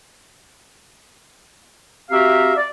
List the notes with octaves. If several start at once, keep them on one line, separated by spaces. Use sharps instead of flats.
C4 F#4 G4 E5 F5 A#5
D5